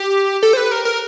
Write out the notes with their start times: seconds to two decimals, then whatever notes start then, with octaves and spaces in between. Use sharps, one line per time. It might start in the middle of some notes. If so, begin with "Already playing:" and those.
Already playing: G4
0.43 A4
0.53 C5
0.57 B4
0.71 A#4
0.85 A#4